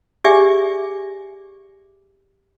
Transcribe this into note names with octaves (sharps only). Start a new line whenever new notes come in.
G4 G#4 D5 E5 G#5 D6